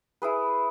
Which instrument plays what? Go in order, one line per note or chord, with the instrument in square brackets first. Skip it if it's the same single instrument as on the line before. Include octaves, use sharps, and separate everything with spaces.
[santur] E4 G#4 B4